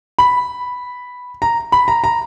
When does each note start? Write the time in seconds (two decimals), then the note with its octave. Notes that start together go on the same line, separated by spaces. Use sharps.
0.19 B5
1.42 A#5
1.72 B5
1.88 A#5
2.04 A#5